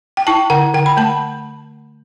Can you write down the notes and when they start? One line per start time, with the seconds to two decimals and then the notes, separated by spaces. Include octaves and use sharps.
0.17 G5
0.27 E4 A5
0.50 D3 F#5
0.74 D3 G5
0.86 B5
0.97 A3 A5